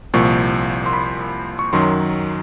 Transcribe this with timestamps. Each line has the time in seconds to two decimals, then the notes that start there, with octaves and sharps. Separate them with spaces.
0.14 C2 A#2 F3 C#6
0.86 C6
0.93 B5
1.59 C#6
1.73 F#2 D#3 F#3 C6